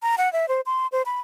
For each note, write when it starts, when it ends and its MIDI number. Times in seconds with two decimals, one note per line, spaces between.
0.03 0.15 82
0.18 0.31 78
0.33 0.48 76
0.48 0.61 72
0.66 0.87 84
0.92 1.02 72
1.06 1.20 83